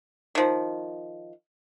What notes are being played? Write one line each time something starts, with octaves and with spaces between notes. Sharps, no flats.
D#3 F3